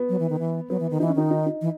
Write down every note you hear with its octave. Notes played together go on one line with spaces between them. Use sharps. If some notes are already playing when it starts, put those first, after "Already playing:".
Already playing: B3
F#3
E3
D#3
E3
F#3 B3
E3
D#3
E3 D#4
C#4
D#3 D#4
D#4
D#4
E3